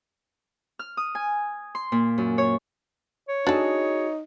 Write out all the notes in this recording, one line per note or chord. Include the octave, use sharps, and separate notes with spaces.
F6
D#6
G#5
C6
A#2
F#2
C#5
C#5
D4 D#4 F#4 G#4 A4